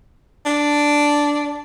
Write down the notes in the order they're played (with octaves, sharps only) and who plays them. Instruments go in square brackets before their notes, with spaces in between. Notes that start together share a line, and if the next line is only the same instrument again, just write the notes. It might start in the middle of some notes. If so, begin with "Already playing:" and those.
[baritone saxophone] D4